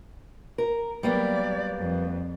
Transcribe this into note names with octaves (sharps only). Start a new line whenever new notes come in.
A#4
F#3 G3 A#3 B3 D5
F2